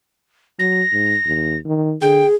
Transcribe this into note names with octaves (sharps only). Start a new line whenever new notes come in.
F#3 A#6
G#2
D#2
D#3
D3 G#4 G5